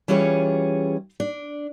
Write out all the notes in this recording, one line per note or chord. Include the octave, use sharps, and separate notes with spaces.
E3 G3 C#4 F4 G#4 C#5
D4